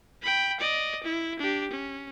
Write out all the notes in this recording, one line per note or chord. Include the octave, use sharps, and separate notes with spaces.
G5 B5
D5 D#5
E4
D4 G4
C#4